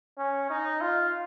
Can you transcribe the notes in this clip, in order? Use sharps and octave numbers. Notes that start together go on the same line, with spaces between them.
C#4
D#4
F4